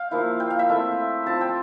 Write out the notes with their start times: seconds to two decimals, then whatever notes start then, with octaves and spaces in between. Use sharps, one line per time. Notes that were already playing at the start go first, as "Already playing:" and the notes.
Already playing: F5 G5
0.11 F3 A#3 E4
0.40 G5
0.50 F5
0.59 E5
0.69 A3 C4 E4
1.26 F3 C4 F4 A5
1.41 G5